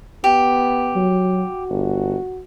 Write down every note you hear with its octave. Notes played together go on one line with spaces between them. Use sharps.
B3 G4
F#3
F#4
G1